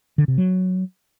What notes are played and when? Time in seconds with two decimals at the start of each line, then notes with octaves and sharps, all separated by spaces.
0.18 D3
0.28 C3
0.38 F#3